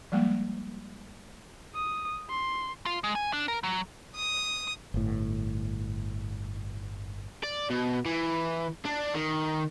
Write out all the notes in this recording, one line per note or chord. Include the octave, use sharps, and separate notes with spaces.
F3 G3 G#3 A#3
D#6
C6
F4
G#3
G#5
D4
A#4
F#3
D#6
G1 A2
D5
B2
E3
D4
D#3